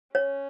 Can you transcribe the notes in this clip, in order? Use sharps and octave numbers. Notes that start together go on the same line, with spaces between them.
C#4 C#5